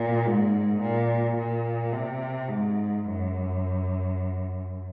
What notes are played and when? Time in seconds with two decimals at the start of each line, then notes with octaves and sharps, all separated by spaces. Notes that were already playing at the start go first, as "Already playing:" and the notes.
Already playing: A#2
0.26 G#2
0.82 A#2
1.38 A#2
1.93 C3
2.49 G#2
3.05 F#2